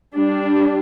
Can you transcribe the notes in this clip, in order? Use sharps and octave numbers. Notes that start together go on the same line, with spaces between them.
G3 D4